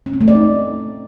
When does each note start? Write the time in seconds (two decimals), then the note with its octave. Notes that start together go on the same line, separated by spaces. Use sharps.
0.06 C#4
0.13 C4
0.21 A3
0.28 D5
0.35 D#4